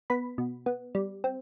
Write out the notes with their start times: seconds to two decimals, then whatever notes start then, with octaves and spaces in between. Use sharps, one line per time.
0.10 B3 B5
0.38 B2
0.66 B3
0.95 G3
1.24 C4